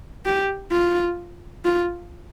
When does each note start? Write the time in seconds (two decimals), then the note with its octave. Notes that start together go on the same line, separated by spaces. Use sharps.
0.26 G4
0.71 F4
1.65 F4